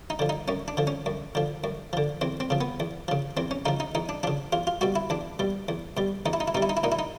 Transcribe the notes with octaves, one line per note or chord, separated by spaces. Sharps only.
D#4
D3 F3
D#4
F#2 C#4
D4
D3 F3
C#4
F#2
D3 F3
F#2
D3 F3
E2 C4
C4
C#3 F3
B3
E2
C#3 F3
E2 C4
C#4
C#3 F3 D#4
D#4
E2 D#4
D4
C#3 F3 D4
E2 F4
F4
B2 G3 F#4
E4
E2 D4
B2 G3
E2
B2 G3
E2 D#4
E4
D#4
E4
B2 G3 D#4
E4
D#4
E4
A#2 D#4
E4
D#4